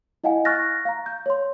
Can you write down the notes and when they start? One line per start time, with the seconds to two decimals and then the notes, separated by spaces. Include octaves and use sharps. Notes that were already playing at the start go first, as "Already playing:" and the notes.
0.24 E4 D#5 F5 F#5 G#5
0.45 C#6 F6 F#6 A6 A#6
0.85 F5 A#5
1.06 G6
1.26 C#5 C6